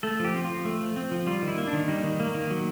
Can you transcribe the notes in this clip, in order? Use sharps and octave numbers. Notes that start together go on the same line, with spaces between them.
A3 A4
F3
G4
C4
F3 F4
A3
F3
C4
F3
G3 F4
D#3
E4
A#3
D4
D#3
G3 D#4
D#3
A#3
D#3
F#3